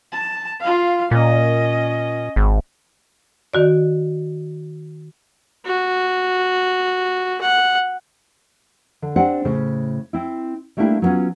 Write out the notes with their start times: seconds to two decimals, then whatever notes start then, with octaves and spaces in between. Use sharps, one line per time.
0.13 A5
0.61 F4 F5
1.11 A#2 C#4 D#5
2.36 G#1
3.54 D#3 F#4 D5
5.66 F#4
7.41 F#5
9.02 D3
9.16 C4 D4 G4 C5 D5 F#5
9.45 A2 C#3 C5
10.13 C4 E4
10.77 G3 A3 A#3 D4 E4 G4
11.02 F#3 A#3 B3 C#4 F4